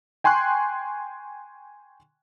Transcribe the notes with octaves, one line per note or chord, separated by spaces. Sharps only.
G5 G#5 C6 C#6 F#6